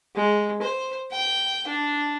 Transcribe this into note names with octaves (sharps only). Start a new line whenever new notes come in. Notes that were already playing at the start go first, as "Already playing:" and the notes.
G#3
C5
G5
D4